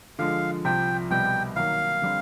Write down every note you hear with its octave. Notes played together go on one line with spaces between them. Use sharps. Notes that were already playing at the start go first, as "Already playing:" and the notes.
D3 F3 G#3 F5
C2 C3 F3 G5
C2 B2 G3 G5
D#3 F#3 A#3 F5
D3 G3 C4